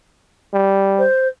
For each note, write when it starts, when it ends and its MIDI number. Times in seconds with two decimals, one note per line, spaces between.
0.53 1.05 55
0.98 1.27 72